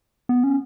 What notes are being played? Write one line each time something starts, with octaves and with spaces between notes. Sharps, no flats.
B3
C#4